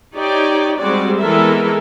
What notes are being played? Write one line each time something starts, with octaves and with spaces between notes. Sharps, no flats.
D#4 G4 C#5 D5 G5
G3 G#3 C4 F#4 G#4 D5
E3 G#3 B3 A4 A#4 E5